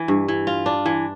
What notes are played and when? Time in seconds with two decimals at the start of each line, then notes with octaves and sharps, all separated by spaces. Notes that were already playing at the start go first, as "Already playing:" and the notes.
Already playing: E3
0.08 G2
0.28 E3
0.47 F4
0.66 D4
0.86 E3